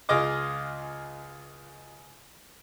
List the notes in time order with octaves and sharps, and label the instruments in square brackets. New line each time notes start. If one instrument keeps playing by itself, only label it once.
[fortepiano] C#2 F4 G#4 D#5 D6